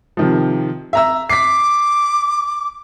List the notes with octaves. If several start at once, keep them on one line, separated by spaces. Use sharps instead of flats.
C3 D#3 F3
E5 A#5 E6
D6 B6 C7